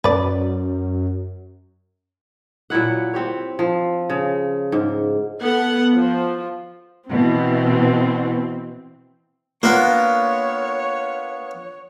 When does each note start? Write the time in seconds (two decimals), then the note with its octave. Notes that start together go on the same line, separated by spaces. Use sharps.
0.04 F#2 B4 D5
2.70 A#2 F#3 E4 F#5
3.14 C4 G4 C#5
3.59 F3
4.10 C#3
4.72 G#2
5.41 B3 A4 F#5
5.94 F3
7.10 B2 E3 C4
9.63 A#3 B3 D4 F4 C#5